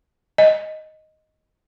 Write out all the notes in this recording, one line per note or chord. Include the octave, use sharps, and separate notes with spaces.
D#5